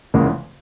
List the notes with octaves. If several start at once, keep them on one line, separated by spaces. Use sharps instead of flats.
F1 E2 C#3 E3 G#3 A#3